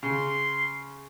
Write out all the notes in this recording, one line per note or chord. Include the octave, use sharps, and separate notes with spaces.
C#3 C6